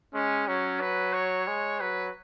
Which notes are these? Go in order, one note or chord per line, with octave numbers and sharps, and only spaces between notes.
G#3 C#4
F#3 C#4
B4
C#5
G#3
F#3 B4